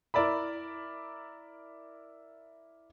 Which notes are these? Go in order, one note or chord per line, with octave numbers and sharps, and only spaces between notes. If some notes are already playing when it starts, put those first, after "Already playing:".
E4 A#4 D5 E5 B5